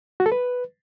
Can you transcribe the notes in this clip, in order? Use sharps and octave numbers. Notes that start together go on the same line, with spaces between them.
F#4
A4
B4